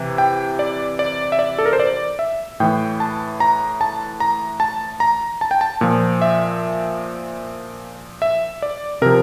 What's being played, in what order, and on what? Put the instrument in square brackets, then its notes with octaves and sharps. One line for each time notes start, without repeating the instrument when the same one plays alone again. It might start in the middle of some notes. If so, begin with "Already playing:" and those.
Already playing: [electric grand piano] C3 E3
G5
D5
D5
E5
D5
A4
A#4
C5
D5
E5
A2 E3 G5
A5
A#5
A5
A#5
A5
A#5
A5
G5
A5
A#2 F3
E5
E5
D5
C3 F3 A#4